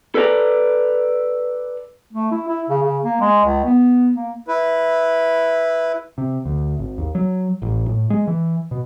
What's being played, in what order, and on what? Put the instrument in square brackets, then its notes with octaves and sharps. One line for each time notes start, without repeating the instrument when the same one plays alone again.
[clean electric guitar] A4 B4 D5 G5 A#5
[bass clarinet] A3
E4
E4
C#3
C#3
A#3
G#3
C#2
B3
A#3
[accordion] E4 B4
[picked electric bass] C3
D2
G#1
D#2
F#3
A1
A2
G#3
E3
B2